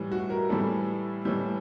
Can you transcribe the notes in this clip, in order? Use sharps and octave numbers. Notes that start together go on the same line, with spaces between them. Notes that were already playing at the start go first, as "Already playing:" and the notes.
Already playing: A2 E3 G3
F#4
A#4
A2 E3 G3 A4
A2 E3 G3